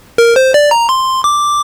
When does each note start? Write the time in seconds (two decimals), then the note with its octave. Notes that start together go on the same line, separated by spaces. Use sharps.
0.18 A#4
0.36 C5
0.54 D5
0.71 A#5
0.89 C6
1.24 D6